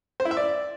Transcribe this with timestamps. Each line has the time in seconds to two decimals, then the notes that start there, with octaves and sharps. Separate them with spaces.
0.20 C5
0.25 E4
0.31 E5
0.37 D5